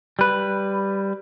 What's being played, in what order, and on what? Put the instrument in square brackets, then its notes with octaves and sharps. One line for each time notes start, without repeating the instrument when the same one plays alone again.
[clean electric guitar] G3 B4